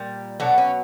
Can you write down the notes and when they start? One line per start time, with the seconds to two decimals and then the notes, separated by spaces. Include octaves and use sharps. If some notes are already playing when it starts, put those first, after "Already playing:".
Already playing: A#2 G3
0.40 B2 F#3 A3 D4
0.58 C#4